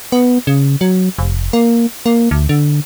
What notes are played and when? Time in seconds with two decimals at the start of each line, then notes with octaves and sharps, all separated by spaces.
0.12 B3
0.47 C#3
0.81 F#3
1.18 F1
1.53 A#3
2.06 A#3
2.31 D2
2.49 D3